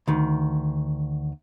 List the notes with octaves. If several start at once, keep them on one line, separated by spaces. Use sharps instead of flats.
D2 D#3